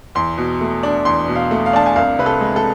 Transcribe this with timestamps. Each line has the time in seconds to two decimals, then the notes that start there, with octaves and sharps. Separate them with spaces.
0.15 E2 C6
0.38 B2
0.61 A3
0.83 D4
1.05 E2 C6
1.28 B2
1.36 F5
1.51 A3
1.66 F5
1.73 D4 A5
1.86 G#5
1.96 C2 F5
2.19 C3 B4
2.26 A4
2.41 G#3
2.56 A4